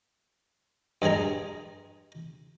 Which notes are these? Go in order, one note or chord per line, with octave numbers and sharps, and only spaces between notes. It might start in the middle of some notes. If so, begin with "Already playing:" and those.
G2 G3 G#3 G#4 A#5